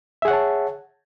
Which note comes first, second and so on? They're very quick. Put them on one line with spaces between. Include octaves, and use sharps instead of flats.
E5 G#4 F#5 C#5 A5